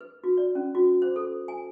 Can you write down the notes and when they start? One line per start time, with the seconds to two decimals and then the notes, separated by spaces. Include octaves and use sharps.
0.01 B4
0.24 F#4
0.37 D5
0.55 C#4
0.75 F#4
1.02 C5
1.16 A4
1.48 G#5